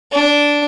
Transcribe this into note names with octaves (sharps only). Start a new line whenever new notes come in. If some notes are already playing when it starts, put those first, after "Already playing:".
D4